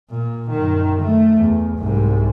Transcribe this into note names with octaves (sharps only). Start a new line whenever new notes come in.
A#2
F#2 D#3
A3
E2
C2 G#2